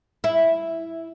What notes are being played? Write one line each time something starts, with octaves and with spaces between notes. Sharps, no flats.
E4